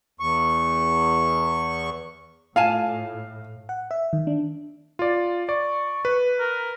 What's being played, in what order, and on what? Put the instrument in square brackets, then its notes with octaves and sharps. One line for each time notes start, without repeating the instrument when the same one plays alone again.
[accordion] E2 C#6
[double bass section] A2 [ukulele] F4 G#5 A5 [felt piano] F5
[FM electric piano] F#5
E5
D#3
D4
[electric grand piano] F4 D5
[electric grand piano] D5 [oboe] C#6
[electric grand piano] B4
[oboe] A#4